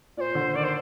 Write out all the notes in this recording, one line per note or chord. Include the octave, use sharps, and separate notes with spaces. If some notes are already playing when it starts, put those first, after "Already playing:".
A#2 C5 D5
D3
D#3 D5
C5